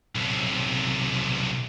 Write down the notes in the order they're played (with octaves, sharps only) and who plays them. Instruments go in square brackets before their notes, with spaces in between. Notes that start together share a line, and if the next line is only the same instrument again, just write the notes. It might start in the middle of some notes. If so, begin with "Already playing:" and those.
[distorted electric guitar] B1 C3